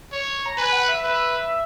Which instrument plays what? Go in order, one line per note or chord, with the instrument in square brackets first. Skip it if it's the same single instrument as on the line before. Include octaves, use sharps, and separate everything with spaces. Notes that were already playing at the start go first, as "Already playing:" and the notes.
[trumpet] C#5
[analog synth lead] A#5
[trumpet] B4 [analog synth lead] G#5
[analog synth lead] F#5
E5
[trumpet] B4